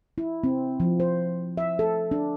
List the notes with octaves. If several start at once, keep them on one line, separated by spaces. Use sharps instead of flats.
E4
C4
F3
C5
E5
A4
D4